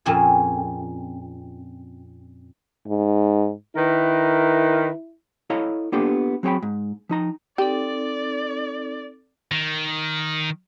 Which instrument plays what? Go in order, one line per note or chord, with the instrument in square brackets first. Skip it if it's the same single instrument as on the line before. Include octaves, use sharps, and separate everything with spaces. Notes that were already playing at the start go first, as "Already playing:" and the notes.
[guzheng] F2 A#2 C4 C#4 G#4
[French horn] G#2
[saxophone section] D#3 A#4 B4 [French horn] E4
[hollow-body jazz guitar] E4 A4 C#5 D#5 F5 A#5
A#3 B3 D4 F4 G4 A4
F#3 C4 G#4 C#5 G5 B5
G#2
F3 D#4 A#5
[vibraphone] C4 D#4 A4 [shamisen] G4 [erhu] D5
[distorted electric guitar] D#3